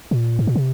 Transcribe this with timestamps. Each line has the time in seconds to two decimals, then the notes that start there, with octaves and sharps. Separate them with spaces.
0.11 A#2
0.39 G#2
0.47 A#2
0.56 C3